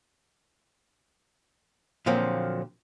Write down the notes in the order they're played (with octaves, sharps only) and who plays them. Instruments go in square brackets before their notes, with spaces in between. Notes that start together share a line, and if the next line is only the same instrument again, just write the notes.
[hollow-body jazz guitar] A#2 D3 F3 F#3 A#3 C4